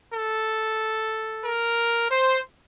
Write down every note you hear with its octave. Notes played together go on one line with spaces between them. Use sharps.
A4
A#4
C5